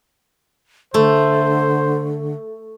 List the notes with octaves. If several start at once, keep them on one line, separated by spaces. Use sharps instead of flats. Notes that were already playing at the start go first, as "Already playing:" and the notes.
D3 A3 C5